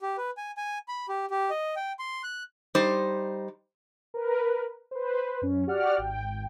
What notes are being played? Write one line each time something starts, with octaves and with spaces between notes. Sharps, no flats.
G4
B4
G#5
G#5
B5
G4
G4
D#5
G5
C6
F#6
G3 D#4 C5
A#4 B4
B4 C5
F#2 C#4
F#4 G4 D5 F#5 F6
G#1 G5